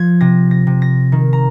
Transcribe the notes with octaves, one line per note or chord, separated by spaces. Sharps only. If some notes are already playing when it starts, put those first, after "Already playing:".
Already playing: F3 G#6
C3 A#6
A#6
C3
A#6
D#3
A#5